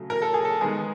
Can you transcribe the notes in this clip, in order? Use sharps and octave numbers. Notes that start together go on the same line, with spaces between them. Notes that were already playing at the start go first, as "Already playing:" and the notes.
Already playing: C#3 F#3 A3
A#4
A4
G#4
A4
D#3 G#3 B3 G#4